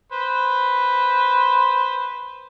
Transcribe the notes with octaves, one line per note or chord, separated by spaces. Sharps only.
B4 C5